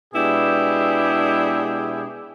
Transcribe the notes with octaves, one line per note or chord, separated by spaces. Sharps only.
B2 G#3 D4 E4 G4 G#4